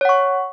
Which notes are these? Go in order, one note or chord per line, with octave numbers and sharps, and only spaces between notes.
C#5 F#5 C#6